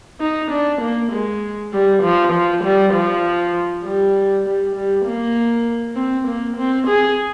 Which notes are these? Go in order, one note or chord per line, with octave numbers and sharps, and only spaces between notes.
D#4
D4
A#3
G#3
G3
F3
F3
G3
F3
G3
G3
G3
A#3
C4
A#3
C4
G#4